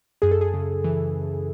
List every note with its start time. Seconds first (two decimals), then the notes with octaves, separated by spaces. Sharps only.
0.22 F#2 G#4
0.31 A4
0.41 G#4
0.54 C#3
0.84 E3